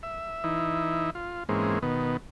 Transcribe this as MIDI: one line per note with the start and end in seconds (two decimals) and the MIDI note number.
0.03 0.43 76
0.44 1.10 52
0.44 1.10 63
0.44 1.10 64
1.15 1.44 65
1.49 1.79 44
1.49 1.79 52
1.49 1.79 56
1.49 1.79 58
1.49 1.79 60
1.49 1.79 61
1.82 2.17 47
1.82 2.17 51
1.82 2.17 59